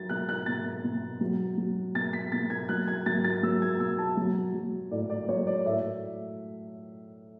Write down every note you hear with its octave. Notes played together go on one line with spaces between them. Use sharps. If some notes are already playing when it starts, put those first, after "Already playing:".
Already playing: F#3 A6
B2 F#6
F#6
B2 A6
B2
F#3
F#3
B2 A6
B6
B2 A6
G#6
F#3 F#6
G#6
F#3 A6
A6
F#3 E6
G#6
B2 E6
A5
F#3
F#3
A2 D5
D5
F#3 C#5
D5
A2 E5